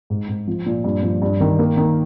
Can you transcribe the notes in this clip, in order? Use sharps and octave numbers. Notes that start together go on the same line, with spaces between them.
G#2
G#2
F3
A#2
G2
F3
G2
D#3
A#3
D#3